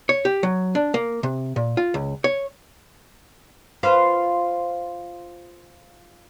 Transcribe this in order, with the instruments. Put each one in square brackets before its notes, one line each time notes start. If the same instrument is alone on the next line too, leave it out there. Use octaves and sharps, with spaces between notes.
[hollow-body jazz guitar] C#5
G4
F#3
D4
A#3
C3
A#2
F4
C#2
C#5
[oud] F4 B4 C5